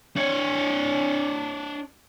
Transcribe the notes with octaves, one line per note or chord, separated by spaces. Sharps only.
D4 C#5